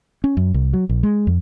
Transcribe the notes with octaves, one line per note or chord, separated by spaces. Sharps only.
C#4
F#2
C2
F#3
A#1
G#3
F2